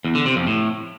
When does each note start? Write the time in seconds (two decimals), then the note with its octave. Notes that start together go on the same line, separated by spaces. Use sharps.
0.04 E2
0.15 D3
0.26 C3
0.36 F2
0.47 A2